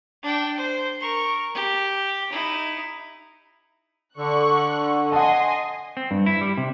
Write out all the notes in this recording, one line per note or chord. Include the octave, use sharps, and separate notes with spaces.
D4 G5
C5
A#4 C#6
G4
D#4 E4
D3 C#6 F#6
D#5 F#5 G#5 A5 C6
C4
G2
E4
G3
C3